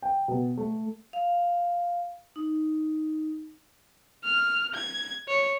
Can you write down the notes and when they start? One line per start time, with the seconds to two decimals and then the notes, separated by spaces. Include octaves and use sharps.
0.02 G5
0.28 B2
0.57 A3
1.13 F5
2.36 D#4
4.24 F6
4.75 G#6
5.28 C#5